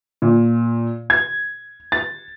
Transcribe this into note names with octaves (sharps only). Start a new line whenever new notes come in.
A#2
G#6
A6